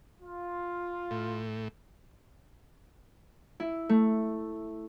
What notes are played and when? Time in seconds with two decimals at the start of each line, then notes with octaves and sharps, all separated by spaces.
0.22 F4
1.11 A2
3.60 E4
3.89 A3